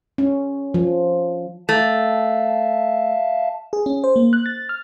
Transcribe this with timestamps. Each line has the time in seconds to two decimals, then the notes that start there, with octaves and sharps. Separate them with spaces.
0.18 C#4
0.74 F3
1.69 A3 E5 F5 A5
3.73 G#4
3.86 C#4
4.04 C5
4.16 A#3
4.33 F#6
4.46 A6
4.69 F6